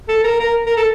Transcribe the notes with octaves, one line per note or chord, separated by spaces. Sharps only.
A4
A#4
A#4
A#4
A4